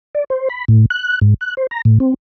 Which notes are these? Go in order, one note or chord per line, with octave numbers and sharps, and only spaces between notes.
D5
C5
B5
A2
F#6
G#2
F#6
C5
A#5
A2
C4